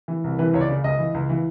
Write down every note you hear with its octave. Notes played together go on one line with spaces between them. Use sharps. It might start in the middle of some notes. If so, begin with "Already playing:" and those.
E3
C2
E3 B4
C#2 C#5
D5
C#3
C#2 D#5
E3
C#2
E3